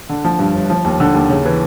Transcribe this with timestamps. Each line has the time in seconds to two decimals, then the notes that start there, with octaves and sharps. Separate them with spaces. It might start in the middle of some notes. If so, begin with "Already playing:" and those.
0.09 D3
0.24 F3
0.39 G2
0.55 G1
0.70 F3
0.85 D#2
1.00 D3
1.14 D#2
1.30 C#3
1.45 E3